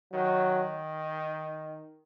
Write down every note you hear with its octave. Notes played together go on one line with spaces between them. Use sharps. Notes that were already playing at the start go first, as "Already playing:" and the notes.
D#3 F#3